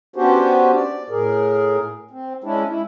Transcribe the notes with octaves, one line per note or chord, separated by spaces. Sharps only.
B3 C#4 D4 F#4 G4 C5
D5
A2 G#4 A#4
C4
G#3 C#4 D4 E4
E4